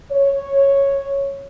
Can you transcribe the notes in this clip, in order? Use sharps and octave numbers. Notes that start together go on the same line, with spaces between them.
C#5